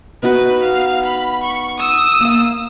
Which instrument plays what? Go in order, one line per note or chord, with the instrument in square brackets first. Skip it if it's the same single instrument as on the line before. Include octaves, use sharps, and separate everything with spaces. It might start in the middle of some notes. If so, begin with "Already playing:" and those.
[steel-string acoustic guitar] B3 D#4 F#4 [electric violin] B4
[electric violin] F5
B5
C#6
D#6 E6
[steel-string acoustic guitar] A#3 F5